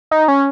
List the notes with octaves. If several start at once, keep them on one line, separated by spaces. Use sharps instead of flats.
D#4
C#4